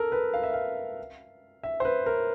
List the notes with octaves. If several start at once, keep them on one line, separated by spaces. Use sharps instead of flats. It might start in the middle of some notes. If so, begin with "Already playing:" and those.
Already playing: A4 A#4
B4
F5
E5
F5
E5
C5
B4
A#4